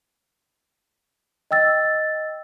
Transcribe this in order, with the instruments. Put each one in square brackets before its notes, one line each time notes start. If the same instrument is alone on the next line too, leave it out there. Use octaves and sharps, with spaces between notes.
[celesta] D#5 G5 E6 A6